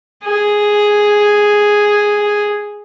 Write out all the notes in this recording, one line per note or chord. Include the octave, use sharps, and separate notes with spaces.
G#4